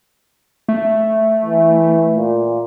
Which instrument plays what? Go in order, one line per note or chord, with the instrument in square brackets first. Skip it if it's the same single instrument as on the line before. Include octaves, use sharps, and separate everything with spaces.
[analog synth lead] A3
[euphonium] E3
A#2